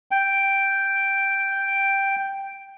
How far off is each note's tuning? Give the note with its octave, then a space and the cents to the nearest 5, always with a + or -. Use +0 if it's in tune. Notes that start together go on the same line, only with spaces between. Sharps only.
G5 +0